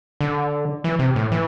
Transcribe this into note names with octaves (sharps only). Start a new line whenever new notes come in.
D3
E3
C3
A2
E3